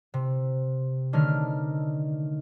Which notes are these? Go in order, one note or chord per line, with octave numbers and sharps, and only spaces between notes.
C3
D3 D#3 A3 D4 C#5 F6